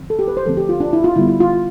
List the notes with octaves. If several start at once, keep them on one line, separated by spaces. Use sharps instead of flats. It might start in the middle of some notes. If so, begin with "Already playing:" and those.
Already playing: D3 F3 C4
A4
G4
B4
C5
D3 F3 A3 C4 A4
G4
F4
D4
E4
F4
D3 G3 B3 E4
E4
F4